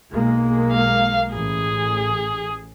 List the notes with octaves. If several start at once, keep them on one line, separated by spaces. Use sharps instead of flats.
B1 G#3 A#3
F5
A1 G#4